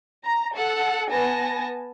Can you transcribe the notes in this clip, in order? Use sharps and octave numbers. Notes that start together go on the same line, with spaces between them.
A#5
A4 F#5
B3 G#5 A5 A#6